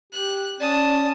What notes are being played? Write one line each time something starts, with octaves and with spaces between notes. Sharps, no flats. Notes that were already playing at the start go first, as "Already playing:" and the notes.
G4 F#6
C#4 D5 A5 D#6